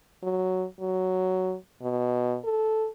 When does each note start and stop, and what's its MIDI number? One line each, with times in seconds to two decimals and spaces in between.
0.23 0.65 54
0.80 1.55 54
1.82 2.37 47
2.44 2.87 69